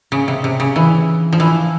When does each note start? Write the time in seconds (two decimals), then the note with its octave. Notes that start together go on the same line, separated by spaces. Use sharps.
0.12 C#3
0.28 C3
0.44 C3
0.60 C#3
0.76 E3
1.33 F3
1.40 E3